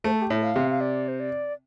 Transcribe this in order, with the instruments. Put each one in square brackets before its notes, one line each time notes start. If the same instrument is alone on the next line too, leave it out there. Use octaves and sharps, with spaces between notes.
[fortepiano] A3 [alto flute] C5
[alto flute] A4
G4
[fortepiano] A2 [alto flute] A4
[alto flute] F5
[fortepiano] C3
[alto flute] F5
D5
C5
D5